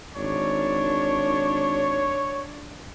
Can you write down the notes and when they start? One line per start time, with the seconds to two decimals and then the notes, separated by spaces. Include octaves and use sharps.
0.16 G#1 D4 C#5